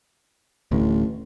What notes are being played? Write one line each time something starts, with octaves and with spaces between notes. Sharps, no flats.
D1 A1 D2